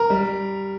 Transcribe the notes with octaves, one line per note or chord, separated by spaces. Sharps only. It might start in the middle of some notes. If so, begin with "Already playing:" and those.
Already playing: A#4 A#5
G3